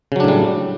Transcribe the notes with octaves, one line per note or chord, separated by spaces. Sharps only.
A2 C#3 F#3 G3 D4